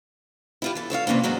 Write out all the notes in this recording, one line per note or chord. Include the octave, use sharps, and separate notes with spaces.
E4 F4 G4
E3 A4
A4 C#5 D#5 F5
C3 E3 A#3 C#4 D4
G#2 F#3 C#4 F#4 G#4 D#5